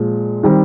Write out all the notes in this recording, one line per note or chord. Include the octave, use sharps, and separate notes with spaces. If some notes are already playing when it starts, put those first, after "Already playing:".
Already playing: A#2 F3 G#3
D#3 G3 C4